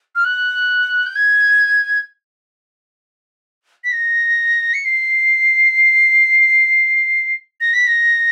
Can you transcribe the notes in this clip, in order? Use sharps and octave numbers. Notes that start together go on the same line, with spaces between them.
F6
F#6
G6
G#6
B6
A#6
C#7
C7
A#6
B6
A#6